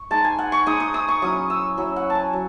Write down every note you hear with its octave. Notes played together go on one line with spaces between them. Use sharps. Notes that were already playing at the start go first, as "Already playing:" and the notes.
Already playing: C#6
G#3 D#4 A5
G#5
F#5
C#6
G#3 D#4 D#6
D#6
D#6
C#6
F#3 C#4 E4 D#6
E6
F#3 C#4 E4 E6
F#5
A5
G#5
F#3